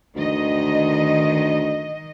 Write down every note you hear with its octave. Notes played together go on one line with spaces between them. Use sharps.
D2 D#3 D#5